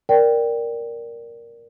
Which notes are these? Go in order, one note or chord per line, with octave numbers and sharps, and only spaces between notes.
A#4 D5 G5